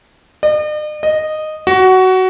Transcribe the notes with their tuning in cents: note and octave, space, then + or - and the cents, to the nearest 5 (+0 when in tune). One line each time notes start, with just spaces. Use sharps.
D#5 -45
D#5 -10
F#4 +15